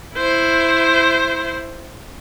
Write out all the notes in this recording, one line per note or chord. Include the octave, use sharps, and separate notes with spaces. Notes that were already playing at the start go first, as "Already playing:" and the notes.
E4 C5